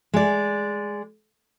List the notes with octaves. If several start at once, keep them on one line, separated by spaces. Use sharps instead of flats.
G#3 D5